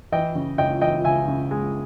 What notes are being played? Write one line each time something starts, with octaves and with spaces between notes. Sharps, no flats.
E3 D#5 G5
C#3
C#2 D#5 G5
E3 D#5 G5
C#2 E5 G#5
C#3
G#3